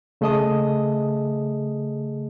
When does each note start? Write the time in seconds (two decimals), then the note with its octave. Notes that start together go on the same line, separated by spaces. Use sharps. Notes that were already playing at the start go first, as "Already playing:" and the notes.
0.21 C#3 A3 G#4 D#5 A5 D#6